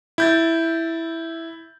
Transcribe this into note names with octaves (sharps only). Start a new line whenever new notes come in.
E4 G6 A6